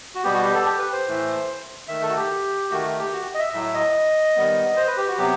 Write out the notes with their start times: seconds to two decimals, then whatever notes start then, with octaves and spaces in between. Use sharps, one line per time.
0.15 F#4
0.24 B2 G3 B3 G4
0.34 F#4
0.44 G4
0.54 A4
0.65 G4
0.79 B4
0.93 C5
1.07 A2 E3 A3
1.88 D#3 A3 E5
2.02 A4
2.09 F#4
2.16 G4
2.71 D#3 A3 F#4
2.99 G4
3.13 F#4
3.34 D#5
3.39 E5
3.53 A2 F#3 A3 E5
3.74 D#5
4.36 D#3 G3 B3
4.76 C5
4.87 B4
4.97 G4
5.08 F#4
5.17 C3 F#3 B3 G4